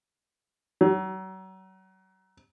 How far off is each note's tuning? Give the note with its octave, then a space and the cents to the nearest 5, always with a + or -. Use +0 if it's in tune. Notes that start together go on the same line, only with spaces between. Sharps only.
F#3 +35